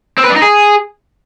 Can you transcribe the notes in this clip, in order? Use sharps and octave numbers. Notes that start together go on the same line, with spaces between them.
C4
B4
D4
D#4
G#4